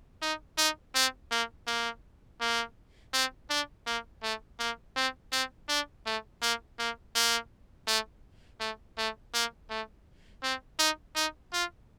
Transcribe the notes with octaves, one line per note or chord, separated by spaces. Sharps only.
D#4
D#4
C4
A#3
A#3
A#3
C4
D4
A#3
A3
A#3
C4
C4
D4
A3
A#3
A#3
A#3
A3
A3
A3
A#3
A3
C4
D#4
D#4
F4